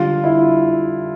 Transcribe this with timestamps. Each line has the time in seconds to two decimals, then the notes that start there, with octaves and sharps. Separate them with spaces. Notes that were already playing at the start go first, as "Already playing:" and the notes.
Already playing: D3 G3 F4
0.24 E4